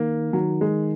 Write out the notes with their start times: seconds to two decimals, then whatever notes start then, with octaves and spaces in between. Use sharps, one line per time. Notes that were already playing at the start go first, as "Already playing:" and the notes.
Already playing: D#3 A#3
0.33 D#3 F#3
0.61 G#3